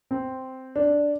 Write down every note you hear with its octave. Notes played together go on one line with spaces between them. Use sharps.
C4
D4